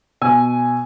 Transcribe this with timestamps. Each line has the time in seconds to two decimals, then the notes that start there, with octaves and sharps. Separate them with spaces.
0.21 B2 G#5 E6